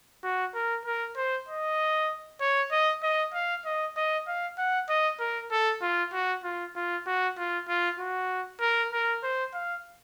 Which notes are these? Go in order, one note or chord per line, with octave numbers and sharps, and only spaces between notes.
F#4
A#4
A#4
C5
D#5
C#5
D#5
D#5
F5
D#5
D#5
F5
F#5
D#5
A#4
A4
F4
F#4
F4
F4
F#4
F4
F4
F#4
A#4
A#4
C5
F5